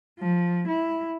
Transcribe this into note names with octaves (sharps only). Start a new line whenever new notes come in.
F3
E4